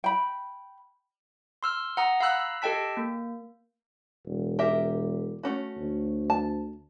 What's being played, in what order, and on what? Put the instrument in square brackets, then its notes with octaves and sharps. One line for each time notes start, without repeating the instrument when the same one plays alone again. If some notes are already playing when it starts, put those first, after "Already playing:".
[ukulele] G5 B5
[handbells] C6 E6 F6
F#5 A#5 D#6
F5 A#5 B5 E6 F#6
E6
G4 A4 D#5 G5 A5 B6
A#3
[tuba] E1
[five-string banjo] G4 A#4 E5
A3 C#4 F#4
[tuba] D2
[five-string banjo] A5